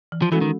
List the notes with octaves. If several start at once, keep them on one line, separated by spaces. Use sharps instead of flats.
E3
F3
E3 G#3 C#4 F#4 A4
D#3